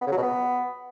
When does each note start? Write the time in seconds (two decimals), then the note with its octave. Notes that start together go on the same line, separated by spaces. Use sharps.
0.01 B3
0.07 C#3
0.12 F#3
0.17 B2
0.23 B3